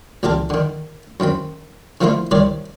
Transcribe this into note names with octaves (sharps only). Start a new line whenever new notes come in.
C#2 A#2 E3 G4 A#4 A5
D3 D#3
F#2 D#3 C4 B5
D3 F3 A3 A#3 E4 F4
C2 G2 C3 D#3 C#5 D5